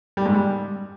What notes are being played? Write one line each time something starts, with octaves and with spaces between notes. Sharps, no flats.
G3
G#2
G3